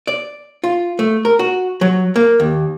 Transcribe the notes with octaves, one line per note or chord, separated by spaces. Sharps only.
D5
F4
A3
A#4
F#4
F#3
A#3
D#2